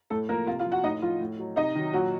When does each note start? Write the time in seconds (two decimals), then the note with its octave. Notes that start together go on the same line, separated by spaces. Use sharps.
0.10 A2 A3 A4
0.29 F3 A#3 A#4
0.47 C3 F4 F5
0.59 F4 F5
0.65 F3
0.72 F#4 F#5
0.83 A2 D#4 D#5
1.02 F3 F4
1.20 A2
1.39 F#3
1.56 C3 D#4 D#5
1.75 D#3 F#3
1.93 A#2 F#3 F#4